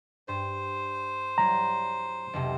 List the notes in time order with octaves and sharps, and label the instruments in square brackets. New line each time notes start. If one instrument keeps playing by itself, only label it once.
[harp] G2 [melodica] C5
[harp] F#3 G3 E4 [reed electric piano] A#5
[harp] B1 F2 C3